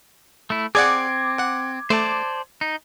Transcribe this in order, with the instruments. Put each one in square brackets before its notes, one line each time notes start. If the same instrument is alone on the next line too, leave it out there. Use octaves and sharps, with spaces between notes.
[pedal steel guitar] A3 E4
[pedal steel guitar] C4 [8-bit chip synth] G#4 D5 F#5 [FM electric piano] D6 G#6
[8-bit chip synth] F#5
[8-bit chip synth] A3 [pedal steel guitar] C5 D5 A5
[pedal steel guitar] D#4